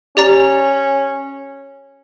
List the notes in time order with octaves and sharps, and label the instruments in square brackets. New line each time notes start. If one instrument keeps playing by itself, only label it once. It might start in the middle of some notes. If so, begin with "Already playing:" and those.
[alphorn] C#4 [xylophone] G4 D5 A#5